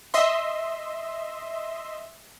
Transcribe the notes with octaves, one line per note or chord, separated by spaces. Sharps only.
D#5 E5 C6